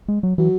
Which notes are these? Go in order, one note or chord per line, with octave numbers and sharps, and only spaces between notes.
G#3
F#3
E3 F#3